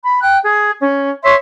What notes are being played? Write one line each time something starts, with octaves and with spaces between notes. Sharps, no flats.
B5
G5 F#6
G#4
C#4
C#5 E5 C6